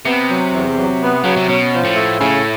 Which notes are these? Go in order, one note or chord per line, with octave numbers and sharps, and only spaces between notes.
C3 B3
F#3
E2
F#3
B3
C#3 F#3
C3
B2 C#4
F3
A2
A3
A2 C#3